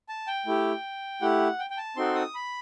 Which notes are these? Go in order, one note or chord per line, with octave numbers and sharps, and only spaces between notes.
A5
G5
A3 E4 G4
A3 E4 G4 F#5
G5
G5
A5
C4 D#4 F#4 A4 C6
D#6
B5